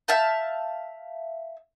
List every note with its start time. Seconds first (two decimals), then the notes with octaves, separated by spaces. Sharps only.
0.08 E5 F5 A5 G6